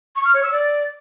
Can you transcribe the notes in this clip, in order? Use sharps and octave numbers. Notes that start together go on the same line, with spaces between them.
C#6
F6
C#5
E6
D5